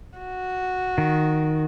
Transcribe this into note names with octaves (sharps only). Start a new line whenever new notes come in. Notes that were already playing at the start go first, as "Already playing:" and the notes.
F#4
D#3